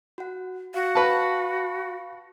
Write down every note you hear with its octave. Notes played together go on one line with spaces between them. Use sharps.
F#4 F#5
F#4 F5
B4 F5 A5 B5 C#6